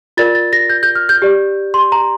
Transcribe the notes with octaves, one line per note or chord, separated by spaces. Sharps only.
F4 A#4 D5 A6
A6
A#6
G6
G6
F6
G6
G4 D5
C6
A#5